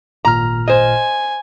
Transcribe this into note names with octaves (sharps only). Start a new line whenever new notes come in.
G#1 A#2 A#5 F6
C5 D#5 G#5